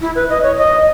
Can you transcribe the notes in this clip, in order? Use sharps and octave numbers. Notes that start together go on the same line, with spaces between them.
E4
B4
D#5
C#5
D#5